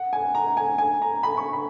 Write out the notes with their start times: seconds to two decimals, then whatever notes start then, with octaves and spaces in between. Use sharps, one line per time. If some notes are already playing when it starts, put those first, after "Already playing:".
Already playing: F#5
0.13 G#5
0.35 A#5
0.57 G#5
0.78 G#5
1.02 A#5
1.23 B5
1.37 C#6
1.53 B5